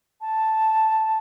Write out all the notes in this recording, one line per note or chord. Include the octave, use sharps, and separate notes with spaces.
A5